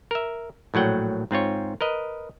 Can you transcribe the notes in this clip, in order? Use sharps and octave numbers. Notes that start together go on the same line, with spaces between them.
A#4 E5
A#1 A2 F#3 F#5 G5
G#2 C4 F4 C#5
A#4 B4 D#5